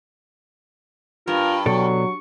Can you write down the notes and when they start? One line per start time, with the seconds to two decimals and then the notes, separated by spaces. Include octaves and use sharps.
1.28 G2 F4 A#4
1.66 B2 F#3 A4 D5 C#6